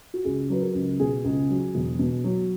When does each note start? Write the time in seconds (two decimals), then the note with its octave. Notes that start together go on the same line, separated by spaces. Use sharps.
0.14 F#4
0.25 C#2 G#4
0.50 F#3 B4
0.62 A#4
0.74 C#2
1.00 B2 G#4
1.24 C#2
1.49 F#3
1.75 E1
1.99 B2
2.24 F#3